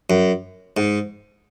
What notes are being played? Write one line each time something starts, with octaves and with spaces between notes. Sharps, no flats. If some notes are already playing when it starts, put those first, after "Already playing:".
F#2
G#2